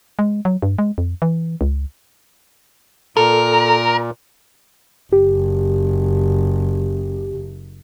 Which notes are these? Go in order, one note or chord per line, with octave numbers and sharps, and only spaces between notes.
G#3
F#3
G2
G#3
F2
E3
C#2
A#2 A4 A#4
F#1 G4